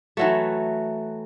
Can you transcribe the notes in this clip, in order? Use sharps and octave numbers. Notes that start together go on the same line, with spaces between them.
E3 F#3 A3